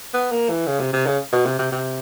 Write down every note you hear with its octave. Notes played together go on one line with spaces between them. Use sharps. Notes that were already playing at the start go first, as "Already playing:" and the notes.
B3
A#3
E3
C#3
C3
C3
C#3
B2
C3
C3
C3